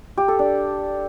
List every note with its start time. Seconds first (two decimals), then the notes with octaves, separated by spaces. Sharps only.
0.18 G4
0.28 A4
0.39 D4